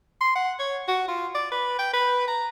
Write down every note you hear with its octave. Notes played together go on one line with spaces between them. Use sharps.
C6
F#5
C#5
F#4
F4
D5
B4
G5
B4
A#5